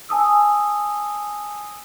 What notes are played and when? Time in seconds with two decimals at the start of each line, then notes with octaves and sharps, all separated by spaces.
0.09 G#5 A5 D#6 E6